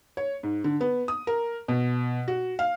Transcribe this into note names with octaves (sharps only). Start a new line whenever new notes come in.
C#5
G#2
D3
B3
D#6
A#4
B2
F#4
F5